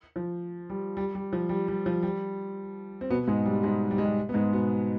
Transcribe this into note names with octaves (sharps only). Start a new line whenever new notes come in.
F3
G3
G3
G3
F3
G3
G3
F3
G3
C4
B2 B3
G#2 G#3
G3
G#2 G#3
G3
G#3
G3
B3
G#2 G#3
B2 B3